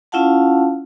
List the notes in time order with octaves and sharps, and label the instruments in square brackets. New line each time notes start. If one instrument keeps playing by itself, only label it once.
[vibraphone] C#4 E4 F4 F5 F#5 A5